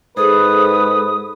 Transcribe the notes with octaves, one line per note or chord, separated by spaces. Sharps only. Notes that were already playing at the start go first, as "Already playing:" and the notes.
G#2 G#4 A4 B4 C5 D#6